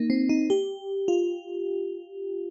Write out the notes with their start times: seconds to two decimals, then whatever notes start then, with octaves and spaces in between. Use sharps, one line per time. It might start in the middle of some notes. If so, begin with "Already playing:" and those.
Already playing: A#3 D#4
0.10 C4
0.29 D#4
0.50 G4
1.08 F4